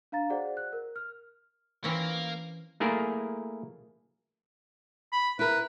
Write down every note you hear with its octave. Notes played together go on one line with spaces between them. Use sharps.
D4 F5 A#5 A6
F#4 G#4 C5 D5 F#5
F#6
A#4
F6
E3 A#3 C4 C#4
A3 A#3 E4 G#4 A#4
B5
E4 A#4 B4